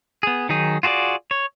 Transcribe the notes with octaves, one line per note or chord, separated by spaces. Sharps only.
B3 G#4
D#3 F#3 D#4 G#4
F4 F#4 G#4 B4 D5
C#5